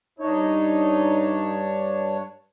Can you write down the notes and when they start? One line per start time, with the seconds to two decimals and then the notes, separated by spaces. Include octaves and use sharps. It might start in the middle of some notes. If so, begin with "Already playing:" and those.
0.19 G2 D4 D#4 C#5